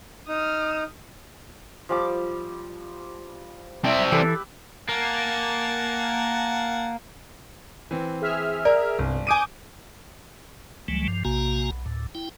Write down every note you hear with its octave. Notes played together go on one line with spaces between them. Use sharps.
D#4 D#6 F6
F3 G3 D6
C4 D5 E5 A5 E6
E3 G4 A4 B4
A#3 F#5 G#5 A5
E3 C4
G#4 E5 F6
A#4 D5
G1 C2
G#5 D6 D#6 G6 D7 D#7
C#2 E3 F#3 G3 A3
G2 F3
A#1 C3 A#3 F#4 G#5 A#5
B1
D2 A2
E4 G5